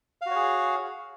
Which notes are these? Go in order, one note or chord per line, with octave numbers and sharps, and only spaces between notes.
F#4 G#4 C#5 F5